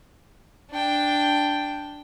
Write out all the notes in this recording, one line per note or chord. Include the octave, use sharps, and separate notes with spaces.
D4 G5